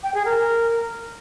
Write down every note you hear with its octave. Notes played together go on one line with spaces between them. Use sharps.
G5
G#4
A#4